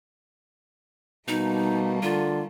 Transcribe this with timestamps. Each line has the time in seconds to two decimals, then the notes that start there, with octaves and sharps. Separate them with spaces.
1.28 B2 G3 A3 A#3 D#4
2.03 D3 F4